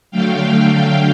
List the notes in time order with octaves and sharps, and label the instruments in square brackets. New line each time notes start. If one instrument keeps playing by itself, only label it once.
[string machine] D3 F#3 A3 F5 G5